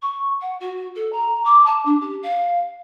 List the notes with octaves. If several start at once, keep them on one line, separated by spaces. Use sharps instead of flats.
C#6
F#5
F#4
A4
A#5
D6
A5
D4
G4
F5